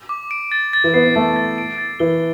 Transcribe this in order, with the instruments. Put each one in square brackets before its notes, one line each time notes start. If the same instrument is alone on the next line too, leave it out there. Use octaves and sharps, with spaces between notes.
[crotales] D6
D7
A6
A6
[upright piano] E3
[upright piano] B3 [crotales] C7
[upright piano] B3
[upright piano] A3 [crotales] A6
[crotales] A6
D7
A6
[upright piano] E3 [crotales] G7